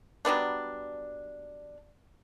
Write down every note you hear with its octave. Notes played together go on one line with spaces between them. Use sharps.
F#3 G3 B3 D4